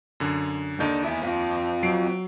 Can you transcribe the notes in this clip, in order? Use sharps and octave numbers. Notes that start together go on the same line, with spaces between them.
F#2 D3
D#2 D4 D#4 A4 G6
B3 E4
C4 F4
F#3 C7 D7